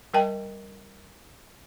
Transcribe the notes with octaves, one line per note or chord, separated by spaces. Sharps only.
G3 A#4 D#5 G5 A5